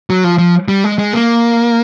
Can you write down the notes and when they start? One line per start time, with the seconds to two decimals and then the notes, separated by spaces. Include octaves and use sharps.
0.10 F#3
0.24 F3
0.38 F3
0.68 G3
0.84 G#3
0.99 G#3
1.13 A#3